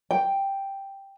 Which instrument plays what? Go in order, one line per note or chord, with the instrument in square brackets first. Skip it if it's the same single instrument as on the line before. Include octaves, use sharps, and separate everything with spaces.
[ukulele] G5